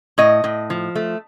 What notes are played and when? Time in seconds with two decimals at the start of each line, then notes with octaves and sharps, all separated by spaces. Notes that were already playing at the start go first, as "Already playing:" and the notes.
0.18 A2 D#5
0.44 A2
0.70 F3
0.95 A3